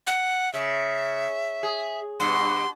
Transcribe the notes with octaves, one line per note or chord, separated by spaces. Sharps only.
F#5
C#3 E5
G#4
G2 B2 C6